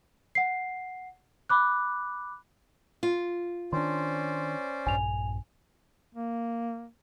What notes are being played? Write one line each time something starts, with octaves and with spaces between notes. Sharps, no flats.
F#5 C7
B5 D6 F#6
F4
D#3 C#4 D4 C5 D5 C6
A#1 G2 G#5 F7
A#3